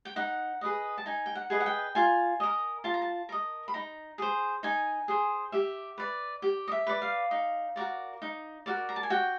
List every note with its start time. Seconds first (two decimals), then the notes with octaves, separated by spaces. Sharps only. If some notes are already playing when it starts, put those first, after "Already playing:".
0.05 G5
0.16 D#4 F#5
0.61 G#4 B4 D#5
0.98 A5
1.06 D#4 G#5
1.26 G5
1.35 F#5
1.50 G#4 B4 D#5
1.60 F#5
1.66 G5
1.95 F4 G#5
2.40 A#4 D#5
2.84 F4 A5
2.94 A#5
3.02 A5
3.29 A#4 D#5
3.68 B5
3.74 D#4 A#5
4.18 G#4 C5
4.63 D#4 G#5
5.08 G#4 C5
5.52 G4 E5
5.98 B4 D5
6.42 G4
6.68 D#5
6.72 E5
6.87 B4 D5
7.02 F5
7.31 D#4
7.76 F#4 A#4 D5
8.22 D#4
8.66 F#4 A#4 D5
8.89 A#5
8.96 A5
9.03 G#5
9.10 F#4 G5